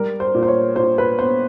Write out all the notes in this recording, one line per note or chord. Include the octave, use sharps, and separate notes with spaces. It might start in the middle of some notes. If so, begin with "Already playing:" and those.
Already playing: G3 A#4
C5
A#2
C5
C#5
A#2 C5
B4
B3 C5